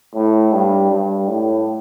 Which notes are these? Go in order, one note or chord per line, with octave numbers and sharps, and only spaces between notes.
A2
G2
G2
A2